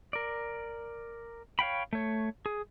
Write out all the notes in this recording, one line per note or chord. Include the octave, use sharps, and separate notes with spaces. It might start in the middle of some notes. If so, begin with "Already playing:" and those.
A#4 D5
C#5 F5 G5 B5
A3 C#5
G#4